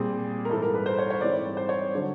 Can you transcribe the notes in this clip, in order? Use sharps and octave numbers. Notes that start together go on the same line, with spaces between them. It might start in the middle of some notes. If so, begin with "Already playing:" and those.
Already playing: A#2 G3 C4 G#4
A#4
G#2 E3 G3 A4
A#4
B4
C5
C#5
C#5
G#2 E3 G3 C4 D5
C5
C#5
D3 F#3